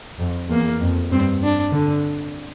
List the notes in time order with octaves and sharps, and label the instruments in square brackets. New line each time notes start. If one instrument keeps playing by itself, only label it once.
[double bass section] F2
[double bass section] E2 [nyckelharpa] A#3
[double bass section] F2
[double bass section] G2 [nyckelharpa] C4
[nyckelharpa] D4
[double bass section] D3